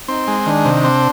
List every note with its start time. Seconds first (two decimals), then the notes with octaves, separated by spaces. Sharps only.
0.08 C4 D#4
0.27 G#3
0.46 D#3 D4
0.65 C3
0.84 C4